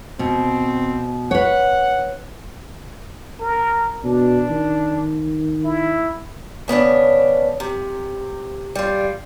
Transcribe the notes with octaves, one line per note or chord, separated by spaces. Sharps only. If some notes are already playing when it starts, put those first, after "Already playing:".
B2 C4
B4 C#5 F#5
A#4
B2 D4
D#3
E4
C#3 B3 C#4 D4
C3
G3 F4